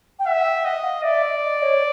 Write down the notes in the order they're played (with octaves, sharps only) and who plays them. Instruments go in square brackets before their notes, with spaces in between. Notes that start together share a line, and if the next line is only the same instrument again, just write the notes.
[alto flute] G5
[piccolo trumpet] E5 [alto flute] F#5
[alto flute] F#5
G5
[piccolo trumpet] D#5 [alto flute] F#5
[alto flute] F5
[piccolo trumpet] D5 [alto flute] E5
[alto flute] D#5
D#5
C#5